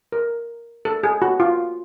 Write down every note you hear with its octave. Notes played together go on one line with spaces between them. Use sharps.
A#4
A4
G#4
F#4
F4